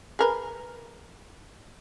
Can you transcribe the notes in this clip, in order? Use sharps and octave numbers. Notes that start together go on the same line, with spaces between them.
G#4 A#4 B4